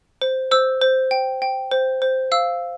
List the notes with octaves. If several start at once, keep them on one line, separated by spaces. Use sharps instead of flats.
C5
C5 E6
C5
G5
G5
C5
C5
F5 E6